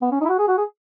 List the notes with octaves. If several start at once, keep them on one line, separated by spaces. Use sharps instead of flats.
B3
C#4
D#4
E4
F#4
G#4
F#4
G#4